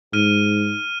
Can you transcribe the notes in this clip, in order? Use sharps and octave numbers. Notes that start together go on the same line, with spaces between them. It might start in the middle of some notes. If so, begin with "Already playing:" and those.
G#2 F6 D#7